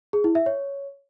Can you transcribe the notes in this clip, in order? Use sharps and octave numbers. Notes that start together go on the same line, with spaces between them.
G#4
E4
E5
C#5